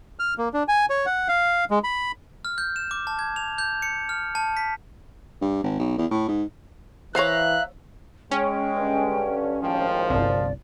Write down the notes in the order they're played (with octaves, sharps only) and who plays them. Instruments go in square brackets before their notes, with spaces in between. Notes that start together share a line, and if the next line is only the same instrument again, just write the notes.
[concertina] F6
A#3
D4
G#5
C#5
F#5
F5
G#3
B5
[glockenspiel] F6
G6
E7
D6
A5
G#6
F7
G6
C#7
F6
A5
B6
[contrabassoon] G2
G#1
B1
E2
A2
G#2
[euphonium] E3 [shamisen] C5 C#5 [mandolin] E5 F5 A#5 [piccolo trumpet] F#6
[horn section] G#3 [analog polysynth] C#4 [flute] G5
[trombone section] G2 D3
[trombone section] G#1 D#2 D4 [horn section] A2 F3 [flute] G5
[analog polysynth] G1 C2 [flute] D5